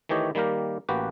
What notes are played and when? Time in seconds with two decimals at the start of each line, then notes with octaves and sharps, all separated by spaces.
0.09 D#3 E3 A3 G4 C#5 D#5
0.35 D#3 G3 A#3 G4 A#4
0.89 A1 A#3 F#4 G4 B4